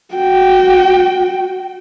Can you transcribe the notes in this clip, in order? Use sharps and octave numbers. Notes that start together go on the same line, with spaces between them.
F#4 G5